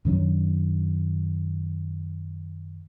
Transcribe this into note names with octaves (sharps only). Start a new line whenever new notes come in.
F#2 D#3 F#3 D4